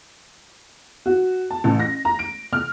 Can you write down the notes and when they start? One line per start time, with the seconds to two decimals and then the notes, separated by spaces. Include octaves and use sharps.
1.06 F#4
1.50 A5
1.64 A1
1.80 A#6
2.05 A#5
2.19 D7
2.53 F6